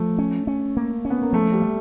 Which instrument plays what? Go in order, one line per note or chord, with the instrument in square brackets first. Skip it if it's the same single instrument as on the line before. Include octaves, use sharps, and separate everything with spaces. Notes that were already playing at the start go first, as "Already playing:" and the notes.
Already playing: [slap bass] F3 [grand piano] A3
[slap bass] C#4
C#4
A#3
C#4
[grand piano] B3
A#3
[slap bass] F3 [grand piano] A3
[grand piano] G3
[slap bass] A3